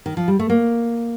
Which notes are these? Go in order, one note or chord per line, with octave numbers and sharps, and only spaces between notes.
D#3
F3
G3
A3
A#3